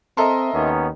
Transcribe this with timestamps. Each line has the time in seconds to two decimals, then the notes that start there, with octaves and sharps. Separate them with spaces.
0.17 C4 A4 A#4 D#5 E5 C6
0.54 D#2 D#3 B3 C#4